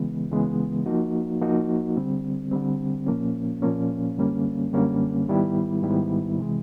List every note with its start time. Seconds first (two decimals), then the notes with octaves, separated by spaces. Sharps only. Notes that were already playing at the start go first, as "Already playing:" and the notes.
Already playing: C#2 C#3 E3 G#3 B3
0.30 C#2 C#3 E3 G#3 B3
0.86 F3 A#3 D#4 F#4
1.41 F3 A#3 D#4 F#4
1.97 D3 G3 C4
2.52 D3 G3 C4
3.07 A#2 F3 A#3 C#4
3.62 A#2 F3 A#3 C#4
4.17 F#2 D3 G3 A#3 C#4
4.72 F#2 D3 G3 A#3 C#4
5.28 G#2 D#3 G3 B3 E4
5.83 G#2 D#3 G3 B3 E4
6.38 C3 E3 G#3